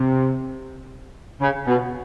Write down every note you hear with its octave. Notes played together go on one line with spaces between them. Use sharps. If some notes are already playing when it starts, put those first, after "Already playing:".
Already playing: C3
C#3
B2